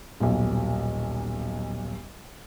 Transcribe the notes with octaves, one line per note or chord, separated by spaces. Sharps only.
D#1 B1